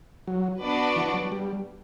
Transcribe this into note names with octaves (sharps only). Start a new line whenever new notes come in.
F#3
B3 D4 F#4 B4 D5
E3
F#3
G3